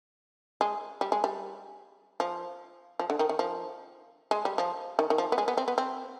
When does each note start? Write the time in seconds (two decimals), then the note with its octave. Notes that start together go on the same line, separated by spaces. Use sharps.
0.61 G#3
1.01 G3
1.12 G#3
1.24 G3
2.20 F3
2.99 F3
3.10 D3
3.19 D#3
3.29 D#3
3.39 F3
4.31 G#3
4.45 G3
4.58 F3
4.99 D#3
5.10 D#3
5.18 F3
5.32 B3
5.38 G#3
5.48 B3
5.57 C4
5.68 B3
5.78 C4